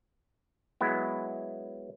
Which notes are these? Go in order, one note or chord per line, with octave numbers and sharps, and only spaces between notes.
F#3 G#3 B3 E4